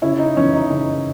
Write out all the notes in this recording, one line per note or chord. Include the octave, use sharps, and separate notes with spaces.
C#3 C#4 E4
D#4
E3 B3 C#4
D#4
C#3 C#4